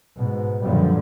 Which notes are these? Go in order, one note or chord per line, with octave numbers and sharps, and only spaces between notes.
G#2 B2
F#2 A#2 D3 F3 G3 B3